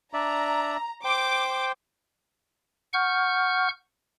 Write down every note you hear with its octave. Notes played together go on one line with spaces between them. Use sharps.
D4 D5 E5 A#5
C5 G5 D6
F#5 C#6 F6 G6